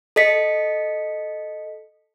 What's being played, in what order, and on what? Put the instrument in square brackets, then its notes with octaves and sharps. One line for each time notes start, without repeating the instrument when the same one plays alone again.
[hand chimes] A4 D#5 B6 C#7